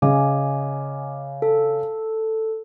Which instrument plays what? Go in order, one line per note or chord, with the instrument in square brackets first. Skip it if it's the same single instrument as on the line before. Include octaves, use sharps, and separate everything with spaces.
[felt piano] C#3 [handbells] D#5 G#5 D6
[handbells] A4